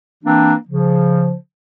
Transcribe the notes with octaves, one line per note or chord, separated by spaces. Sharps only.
E3 A#3 C4 D4
C#3 F3